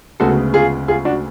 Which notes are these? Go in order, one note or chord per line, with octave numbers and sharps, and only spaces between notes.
D2 C#3 G#3 B3 F#4 A4
F4 G#4
F4 G#4
D4 F#4